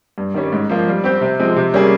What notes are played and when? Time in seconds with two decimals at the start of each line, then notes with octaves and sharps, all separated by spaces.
0.18 G2
0.34 D#3 G3 C#4
0.52 G#2
0.69 F3 A#3 F4
0.87 G3
1.04 C4 G4 C5
1.21 C3
1.39 F3 G#3 C4
1.56 C3
1.74 G3 A#3 C#4 G#4